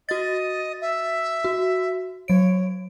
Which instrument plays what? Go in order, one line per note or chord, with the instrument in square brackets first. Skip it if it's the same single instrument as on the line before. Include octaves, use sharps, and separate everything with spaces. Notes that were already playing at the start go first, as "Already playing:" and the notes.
[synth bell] F#4 A6 [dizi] D#5
[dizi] E5
[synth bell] F#4
[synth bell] F#3 D7 [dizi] C#5